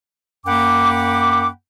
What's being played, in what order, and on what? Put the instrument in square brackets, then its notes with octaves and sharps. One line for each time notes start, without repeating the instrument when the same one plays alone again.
[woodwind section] F#2 A#3 F#5 G5 B5 D6